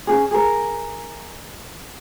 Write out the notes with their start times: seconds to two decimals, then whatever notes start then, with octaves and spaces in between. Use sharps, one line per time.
0.07 C#4 D#4 G#4
0.31 G#4 A#4